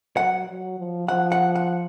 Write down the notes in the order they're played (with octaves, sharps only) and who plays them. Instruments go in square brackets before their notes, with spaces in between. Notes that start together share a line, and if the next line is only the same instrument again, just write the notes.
[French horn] F#3 [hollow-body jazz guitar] F#5
[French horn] F#3
F3
[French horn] F3 [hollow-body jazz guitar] F#5
[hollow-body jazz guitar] F#5
F#5